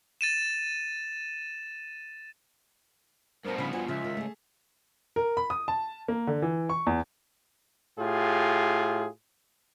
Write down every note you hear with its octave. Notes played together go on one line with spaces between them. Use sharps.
A6 D#7 E7
G2 B2 A#4 C5
C#3 F3 B5
F4 F#4 C5 G#5
C#2 C#3 F3 E5
D#3
A3 G#4
A#4
B5
D#6
A5
A#3
D3
E3
C#6
E2
A2 F4 G4 G#4